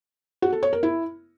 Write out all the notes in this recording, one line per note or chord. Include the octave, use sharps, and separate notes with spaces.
F#4
A4
C#5
A#4
E4